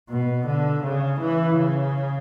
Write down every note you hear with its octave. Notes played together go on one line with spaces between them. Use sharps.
B2
D3
C#3
E3
C#3